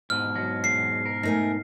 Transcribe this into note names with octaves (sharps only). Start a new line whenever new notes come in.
G#2 B2 F6
F#3
E2 G#4 C7
A#4
A3 D#4 A#4 G#5